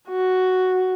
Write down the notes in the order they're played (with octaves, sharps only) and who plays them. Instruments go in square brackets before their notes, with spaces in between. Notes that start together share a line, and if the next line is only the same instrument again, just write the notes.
[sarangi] F#4